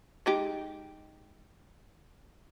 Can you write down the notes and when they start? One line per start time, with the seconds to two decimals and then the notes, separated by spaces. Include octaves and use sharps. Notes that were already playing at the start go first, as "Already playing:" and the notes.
0.26 G#3 D#4 G4